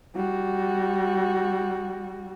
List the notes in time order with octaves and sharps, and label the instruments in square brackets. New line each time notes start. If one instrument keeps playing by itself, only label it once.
[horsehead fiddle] G3 F#4